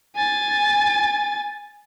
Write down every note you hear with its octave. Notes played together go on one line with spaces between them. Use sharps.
G#5 A6